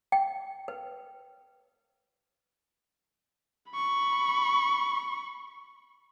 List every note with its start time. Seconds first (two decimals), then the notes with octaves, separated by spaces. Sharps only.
0.12 G5
0.68 B4
3.71 B5 C#6